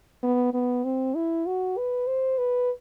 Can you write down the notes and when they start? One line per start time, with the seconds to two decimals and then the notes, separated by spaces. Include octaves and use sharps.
0.23 B3
0.54 B3
0.85 C4
1.15 E4
1.47 F#4
1.77 B4
2.07 C5
2.38 B4